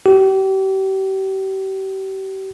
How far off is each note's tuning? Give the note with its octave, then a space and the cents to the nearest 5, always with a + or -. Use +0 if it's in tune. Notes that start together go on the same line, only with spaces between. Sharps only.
G4 -35